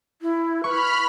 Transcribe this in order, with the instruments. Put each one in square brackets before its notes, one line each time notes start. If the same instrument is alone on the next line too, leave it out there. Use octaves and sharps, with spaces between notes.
[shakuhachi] E4
[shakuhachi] B4 [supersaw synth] B5 F6 [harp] C#6